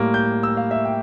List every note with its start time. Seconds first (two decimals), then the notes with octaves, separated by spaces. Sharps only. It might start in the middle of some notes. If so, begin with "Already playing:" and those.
Already playing: A2 G3 A#3
0.14 G6
0.43 E6
0.57 F5
0.71 E5
0.85 G5